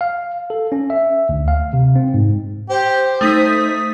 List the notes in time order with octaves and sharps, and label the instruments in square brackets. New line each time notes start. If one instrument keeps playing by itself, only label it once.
[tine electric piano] F5
A4
C#4
E5
D2
F5
C3
C4
G#2
[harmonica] G4 [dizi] C5
[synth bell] A3 D#4 B6 [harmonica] D#6